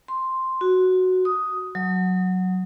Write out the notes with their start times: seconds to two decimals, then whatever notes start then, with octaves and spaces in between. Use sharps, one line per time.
0.08 C6
0.61 F#4
1.25 D#6
1.75 F#3